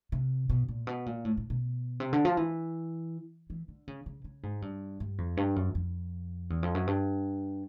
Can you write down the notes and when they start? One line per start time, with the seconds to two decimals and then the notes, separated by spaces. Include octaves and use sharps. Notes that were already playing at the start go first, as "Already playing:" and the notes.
0.12 C3
0.50 B2
0.69 A#2
0.87 B2
1.06 A#2
1.25 A2
1.37 A2
1.50 B2
2.00 C3
2.13 D3
2.25 F3
2.37 E3
3.50 E3
3.68 D3
3.88 C#3
4.06 C#3
4.24 C#3
4.43 G#2
4.62 G2
5.00 G2
5.18 F2
5.37 G2
5.56 F#2
5.75 F2
6.50 E2
6.63 F2
6.75 F#2
6.87 G2